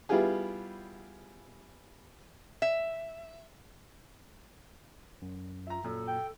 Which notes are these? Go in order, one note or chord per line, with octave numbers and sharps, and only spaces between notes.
G3 B3 E4 F4 G4 G#4
E5
F#2
F4 E5 A#5
F#2 A#2 A4
G5